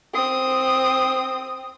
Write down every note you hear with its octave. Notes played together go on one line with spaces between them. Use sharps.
C4 D#6